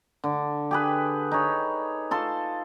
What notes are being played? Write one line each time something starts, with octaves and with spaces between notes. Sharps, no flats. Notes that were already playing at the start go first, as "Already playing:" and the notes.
D3
G4 G#4 B4
D#4 G#4 C#5
F4 A4 C6